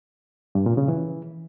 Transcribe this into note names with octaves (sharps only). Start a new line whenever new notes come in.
G2
A#2
C#3
E3